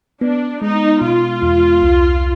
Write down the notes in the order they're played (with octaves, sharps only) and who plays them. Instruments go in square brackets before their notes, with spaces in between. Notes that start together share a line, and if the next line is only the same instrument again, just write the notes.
[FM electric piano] B3 [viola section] D4
[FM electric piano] G#3 [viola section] D#4
[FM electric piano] B2 [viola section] F4
[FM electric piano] E2
C2